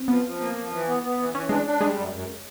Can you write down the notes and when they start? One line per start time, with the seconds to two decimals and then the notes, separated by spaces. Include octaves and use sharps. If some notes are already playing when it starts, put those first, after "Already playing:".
Already playing: C4
0.08 F3 B3
0.24 F3
0.40 A#3
0.56 F3
0.71 E3
0.87 B3
1.03 B3
1.18 E3
1.34 E3 C#4
1.49 G#3 D4
1.66 D4
1.81 G3 G#3
1.97 F#2
2.13 F#2